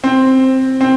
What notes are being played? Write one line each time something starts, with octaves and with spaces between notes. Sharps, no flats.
C4
C4